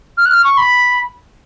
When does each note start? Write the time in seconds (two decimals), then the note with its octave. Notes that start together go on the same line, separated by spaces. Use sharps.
0.17 F6
0.26 F#6
0.30 F6
0.44 C#6
0.57 B5